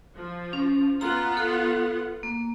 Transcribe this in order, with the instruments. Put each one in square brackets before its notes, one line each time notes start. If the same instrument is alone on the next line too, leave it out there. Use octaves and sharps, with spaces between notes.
[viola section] F3
[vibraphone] C#4
[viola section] B3 F4 F#5 [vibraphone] A#5
[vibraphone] A4
A#3